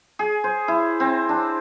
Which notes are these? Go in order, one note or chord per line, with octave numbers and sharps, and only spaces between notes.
G#4
C5
E4
C4
D4